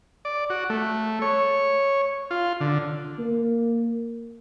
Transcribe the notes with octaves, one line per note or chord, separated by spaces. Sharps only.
D5
F#4
A3
C#5
F4
D3
A#3